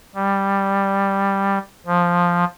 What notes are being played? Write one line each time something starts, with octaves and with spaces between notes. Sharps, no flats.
G3
F3